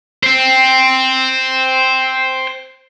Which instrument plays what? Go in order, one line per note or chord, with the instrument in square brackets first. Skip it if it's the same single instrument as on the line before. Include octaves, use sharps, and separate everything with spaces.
[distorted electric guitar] C5 G5